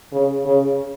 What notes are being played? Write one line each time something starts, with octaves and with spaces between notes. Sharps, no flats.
C#3
C#3